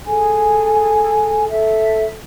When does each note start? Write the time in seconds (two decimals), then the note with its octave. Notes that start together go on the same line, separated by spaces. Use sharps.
0.06 G#4 A4 G#5
1.48 A4 E5